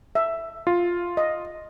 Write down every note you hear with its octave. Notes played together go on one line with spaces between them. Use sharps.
E5
F4
D#5